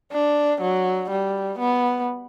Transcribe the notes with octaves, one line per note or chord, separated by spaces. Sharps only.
D4
F#3
G3
B3